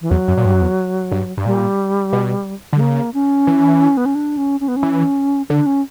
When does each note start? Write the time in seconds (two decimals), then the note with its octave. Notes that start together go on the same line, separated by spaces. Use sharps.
0.01 E3
0.10 E2 F#3
0.28 F#2
0.37 A#2
0.45 G2
0.53 F#2
0.61 E2
1.11 G2
1.37 G2
1.45 A#2 G3
2.13 B2
2.73 D3
2.76 G3
2.80 C#3 A#3
3.14 C#4
3.47 E3
3.97 B3
4.06 C#4
4.15 D4
4.37 C#4
4.60 C#4
4.68 B3
4.76 C#4
4.83 E3
5.49 D3 D4
5.66 C#4